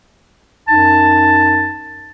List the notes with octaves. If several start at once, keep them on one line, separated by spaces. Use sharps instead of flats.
F#2 D#4 A5